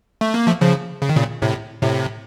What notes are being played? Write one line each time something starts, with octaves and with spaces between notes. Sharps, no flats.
A3
A#3
F3 A3
C#3 F3
C#3
D#3
A#2 C#3
A2 C3
A2 C3